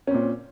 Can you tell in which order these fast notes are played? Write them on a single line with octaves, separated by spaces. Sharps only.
C#4 C4 A#2